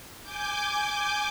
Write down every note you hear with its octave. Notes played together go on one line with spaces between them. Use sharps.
G#5 D6 G6